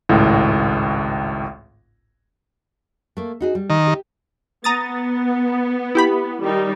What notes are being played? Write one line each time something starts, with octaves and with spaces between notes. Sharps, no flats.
G#1 C#2 A2
A3 A#3
D#4 F#4 G#4
G3
D#3
G4
B3 A#5 D#6 A6
E4 G4 B5
D#3 G3 D#4